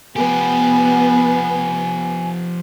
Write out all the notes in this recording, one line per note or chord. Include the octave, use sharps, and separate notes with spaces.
F3 B3 G4 G#5